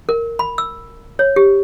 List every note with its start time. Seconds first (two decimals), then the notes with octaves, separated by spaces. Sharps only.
0.09 A#4
0.39 B5
0.58 E6
1.19 C#5
1.36 G4